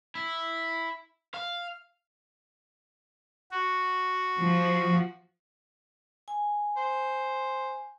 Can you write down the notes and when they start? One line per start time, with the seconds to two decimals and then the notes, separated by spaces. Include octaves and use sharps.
0.15 E4
1.34 F5
3.51 F#4
4.39 F3
6.28 G#5
6.78 C5